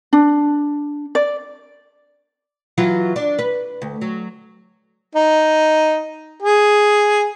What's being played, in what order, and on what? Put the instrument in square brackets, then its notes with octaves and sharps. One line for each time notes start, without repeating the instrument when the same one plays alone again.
[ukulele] D4
D5
[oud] E3 F#3 F4
D4
B4
D2
F#3
[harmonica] D#4
G#4